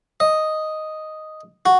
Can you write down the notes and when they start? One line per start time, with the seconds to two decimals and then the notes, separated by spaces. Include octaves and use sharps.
0.20 D#5
1.66 F#4